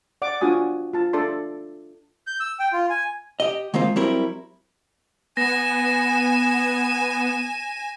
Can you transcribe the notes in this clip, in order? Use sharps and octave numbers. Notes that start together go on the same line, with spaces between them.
D5 F#5 D6
D4 F4 F#4 G#5 D#6
F4 A5
D4 A4 D5 C6
G6
E6
G5
F4
G#5
G4 D#5
D#3 G#3 A#3 C4 F4
F#3 G3 C4 E4 A#4
B3 G#5 A#6 E7